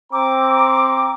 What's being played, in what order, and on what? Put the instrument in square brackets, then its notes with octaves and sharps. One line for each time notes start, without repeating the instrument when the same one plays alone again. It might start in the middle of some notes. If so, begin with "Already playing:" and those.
[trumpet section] C4 A#5 [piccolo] D6